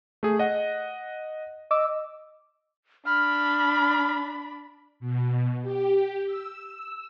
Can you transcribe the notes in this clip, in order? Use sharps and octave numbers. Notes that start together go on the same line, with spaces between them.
A3 G#4
D#5 F#5
D#5 D6 E6
D4 B5 F6
B2
G4
E6